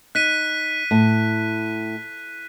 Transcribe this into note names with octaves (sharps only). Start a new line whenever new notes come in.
D#4 F#6 B6 D#7
A2